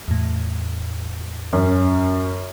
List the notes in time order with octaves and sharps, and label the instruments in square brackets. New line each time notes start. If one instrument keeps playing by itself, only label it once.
[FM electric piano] E2 A2
[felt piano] F#2 C#4